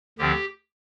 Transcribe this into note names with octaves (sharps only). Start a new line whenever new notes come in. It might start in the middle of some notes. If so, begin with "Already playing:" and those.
D2 D3 F3 C4 G4